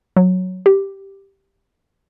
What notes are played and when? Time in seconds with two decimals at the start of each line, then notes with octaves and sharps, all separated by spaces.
0.16 F#3
0.66 G4